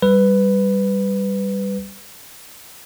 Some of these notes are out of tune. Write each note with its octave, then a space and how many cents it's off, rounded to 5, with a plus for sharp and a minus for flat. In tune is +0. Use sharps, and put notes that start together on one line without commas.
G3 +0 B4 +10